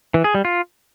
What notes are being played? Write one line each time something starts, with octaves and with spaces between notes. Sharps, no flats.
E3
G#4
G3
F4